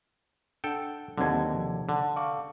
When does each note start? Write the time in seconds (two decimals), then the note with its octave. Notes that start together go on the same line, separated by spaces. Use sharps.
0.64 D4 A4 F#5 G5
1.18 D#2 D3 F#3 C4 G#6
1.53 C3 F3
1.89 D3
2.16 F5 C#6 D6